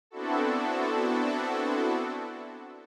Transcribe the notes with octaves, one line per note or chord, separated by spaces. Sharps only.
B3 C4 D4 E4 F#4 A4